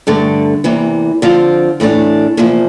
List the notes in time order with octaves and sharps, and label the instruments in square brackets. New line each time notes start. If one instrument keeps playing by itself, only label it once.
[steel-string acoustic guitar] G2 D3 A3
E2 C3 E3 A#3
D3 F3 C4 F4
A2 E3 A3 D4
E2 C3 F3 A#3